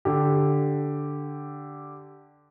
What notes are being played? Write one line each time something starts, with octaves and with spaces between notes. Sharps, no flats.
D3 G4